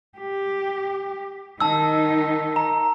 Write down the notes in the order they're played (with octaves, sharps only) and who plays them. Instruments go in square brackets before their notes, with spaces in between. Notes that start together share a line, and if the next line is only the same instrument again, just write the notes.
[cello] G4
[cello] D#3 D#4 [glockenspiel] A5 E6
[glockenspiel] A#5